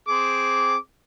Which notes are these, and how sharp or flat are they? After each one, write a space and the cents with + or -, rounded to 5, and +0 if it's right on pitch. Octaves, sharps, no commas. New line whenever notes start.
C4 +0 G#4 +0 D6 -10